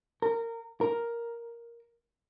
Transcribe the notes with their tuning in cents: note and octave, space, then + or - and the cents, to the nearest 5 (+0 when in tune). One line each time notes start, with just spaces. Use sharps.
A#4 -20
A#4 +5